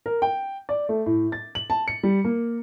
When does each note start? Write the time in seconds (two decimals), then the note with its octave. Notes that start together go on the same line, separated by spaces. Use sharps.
0.06 A#4
0.22 G5
0.69 D5
0.89 A3
1.06 A2
1.32 A6
1.55 F#7
1.70 A5
1.88 C#7
2.03 G3
2.24 A#3